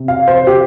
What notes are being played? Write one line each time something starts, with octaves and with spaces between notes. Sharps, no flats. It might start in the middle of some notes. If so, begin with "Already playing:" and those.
Already playing: C3
F5
C5
G4